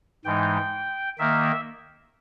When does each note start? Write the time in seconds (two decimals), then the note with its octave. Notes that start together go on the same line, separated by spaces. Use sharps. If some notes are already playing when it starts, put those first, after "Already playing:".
0.25 G#2 E3 G#3 D#4 G5
1.18 D#3 A#3 E5